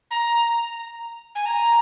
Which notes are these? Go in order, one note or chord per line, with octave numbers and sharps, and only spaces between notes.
A#5
G#5
A#5